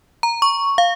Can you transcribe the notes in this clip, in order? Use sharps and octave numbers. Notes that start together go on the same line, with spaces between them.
A#5
C#6
F5